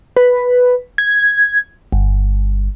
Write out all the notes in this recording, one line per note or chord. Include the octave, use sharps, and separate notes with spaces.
B4
G#6
G1